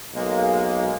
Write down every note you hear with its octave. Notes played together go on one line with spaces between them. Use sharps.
B1 G#3 A#3